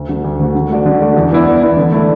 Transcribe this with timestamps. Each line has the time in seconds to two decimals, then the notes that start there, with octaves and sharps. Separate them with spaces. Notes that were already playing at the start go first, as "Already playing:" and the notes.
Already playing: D2
0.09 D3 A3 F#4
0.24 D2
0.40 D3 A3 F#4
0.55 D3
0.70 A3 F#4 D5
0.86 D3
1.01 A3 F#4 D5
1.17 E2
1.31 E3 B3 E4 D5
1.46 E2
1.61 E3 B3 E4 D5
1.77 D3
1.92 A3 E4 D5